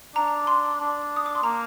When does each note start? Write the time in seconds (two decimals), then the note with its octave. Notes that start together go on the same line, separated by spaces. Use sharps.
0.16 D4 A#5
0.47 C6
0.80 D4
1.16 D#6
1.26 D6
1.35 C6
1.43 A#3 A#5